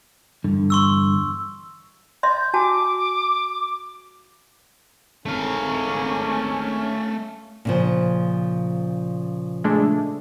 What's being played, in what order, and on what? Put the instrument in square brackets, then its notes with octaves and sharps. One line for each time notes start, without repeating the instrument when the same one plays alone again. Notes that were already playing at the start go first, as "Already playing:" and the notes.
[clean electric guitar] E2 G2 D3
[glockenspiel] C6 C#6 E6
[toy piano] D#5 E5 C6 [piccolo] G6
[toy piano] F#4 G#5 A5 [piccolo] D6
[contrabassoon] G#1 [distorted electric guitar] A3 F5 [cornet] C#4
[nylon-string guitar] A#2 C#3 F3
[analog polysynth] G#3 A3 D4